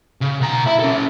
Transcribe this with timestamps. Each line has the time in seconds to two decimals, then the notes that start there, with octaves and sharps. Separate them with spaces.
0.21 C#3
0.40 B2 A#5
0.66 E4 E5
0.79 C#4 A4